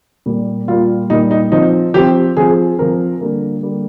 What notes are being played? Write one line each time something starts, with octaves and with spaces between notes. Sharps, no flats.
A#2 G3 A#3
A#2 G3 A#3 F4
A#2 G3 A#3 D#4
D#4
F3 C4 D#4
F3 C4 G4
F3 C4 G#4
F3 C4 A#4
D3 G3 A#3
D3 G3 A#3